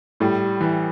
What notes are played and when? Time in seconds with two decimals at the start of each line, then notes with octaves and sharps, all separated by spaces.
0.20 A2 G3
0.61 E3